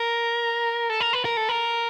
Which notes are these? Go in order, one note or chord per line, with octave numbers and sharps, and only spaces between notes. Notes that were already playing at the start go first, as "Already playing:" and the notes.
Already playing: A#4
A4
A#4
B4
A#4
A4
A#4